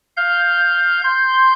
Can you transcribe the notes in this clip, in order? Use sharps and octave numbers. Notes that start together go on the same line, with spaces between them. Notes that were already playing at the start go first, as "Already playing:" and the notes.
F5 G6
C6 G6